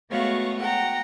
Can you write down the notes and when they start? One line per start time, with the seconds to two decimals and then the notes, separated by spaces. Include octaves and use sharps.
0.11 G#3 A3 B3 F#4 C#5 F5
0.59 F#5 G5 A#5